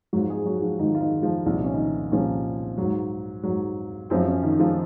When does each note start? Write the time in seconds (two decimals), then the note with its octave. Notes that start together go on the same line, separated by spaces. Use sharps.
0.13 G#2 F3 F#3 F#4
0.30 G#3 G#4
0.45 F#3 F#4
0.62 F3 F4
0.79 G#2 D#3 D#4
0.84 F3
0.95 F4
1.01 D#3 D#4
1.23 F3 F4
1.46 C2 A#2 F3 F4
1.56 D#4
1.64 C#4
1.74 D#3 D#4
2.12 C2 A#2 F3 C#4
2.78 G#2 F#3
3.43 G#2 F#3
4.10 F#2 F3 C4
4.27 C#4
4.43 D#3 D#4
4.59 F3 F4